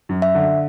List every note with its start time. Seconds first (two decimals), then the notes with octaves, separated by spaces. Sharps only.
0.09 F#2
0.22 E5
0.35 D3